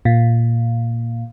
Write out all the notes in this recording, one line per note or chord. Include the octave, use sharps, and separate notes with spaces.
A#2